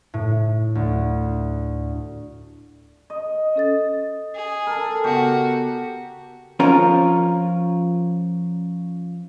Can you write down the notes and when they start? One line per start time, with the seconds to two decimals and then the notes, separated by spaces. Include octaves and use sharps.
0.14 A2
0.75 D2
3.10 D#5
3.56 C#4 A4 A6
4.35 G#4
4.67 A4 A#4 G#5
5.04 C#3 B3 F#4 G4 C#6
6.60 F3 C#4 F4 A#4